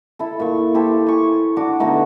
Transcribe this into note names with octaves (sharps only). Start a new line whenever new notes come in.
E4 A4
A#2 C#6
E4 G4 A4 C5
G#5 C#6
D4 F#4 D6
B2 D3 A3 D#4